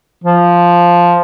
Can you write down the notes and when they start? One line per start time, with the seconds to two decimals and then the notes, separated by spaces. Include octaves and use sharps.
0.24 F3